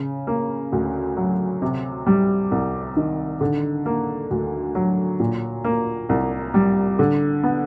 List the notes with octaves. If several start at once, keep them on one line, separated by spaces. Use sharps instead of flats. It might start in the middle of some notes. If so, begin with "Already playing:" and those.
Already playing: C#3
A#3
D2
F#3
C3
G3
C2
D#3
D3
A#3
D2
F#3
A#2
A#3
C2
G3
D3
B3